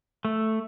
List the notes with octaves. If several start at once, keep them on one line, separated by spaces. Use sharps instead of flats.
A3